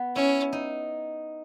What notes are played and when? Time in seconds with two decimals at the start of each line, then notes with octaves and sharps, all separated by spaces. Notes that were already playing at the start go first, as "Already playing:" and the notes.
Already playing: B3
0.15 C#4 E4
0.53 D#4